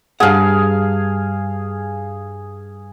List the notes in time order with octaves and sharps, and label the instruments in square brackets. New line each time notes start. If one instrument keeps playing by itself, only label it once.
[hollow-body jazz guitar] G2 F#5 [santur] G#4 F5